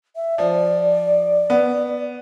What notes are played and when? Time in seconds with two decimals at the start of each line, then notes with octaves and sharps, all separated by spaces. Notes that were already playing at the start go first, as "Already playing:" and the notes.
0.16 E5
0.38 F3 D5
1.50 B3